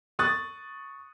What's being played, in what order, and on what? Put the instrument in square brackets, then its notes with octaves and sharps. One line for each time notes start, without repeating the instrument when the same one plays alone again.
[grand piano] C#6 D#6 F#6 A6